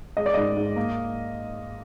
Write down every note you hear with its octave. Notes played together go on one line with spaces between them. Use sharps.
G#3 D#5
D5
G#2 D#5
G#2
A#3